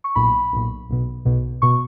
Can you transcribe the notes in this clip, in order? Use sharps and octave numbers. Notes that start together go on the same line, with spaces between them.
C#6
B1 A#2 B5
B1 A#2
B1 B2
B1 B2
B2 C#6